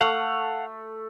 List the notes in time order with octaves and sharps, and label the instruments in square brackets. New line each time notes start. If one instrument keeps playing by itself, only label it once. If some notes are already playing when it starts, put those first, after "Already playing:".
[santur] A3 [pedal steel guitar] F5 F#5